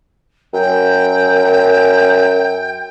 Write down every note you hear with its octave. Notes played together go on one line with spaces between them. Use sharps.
F#2 G5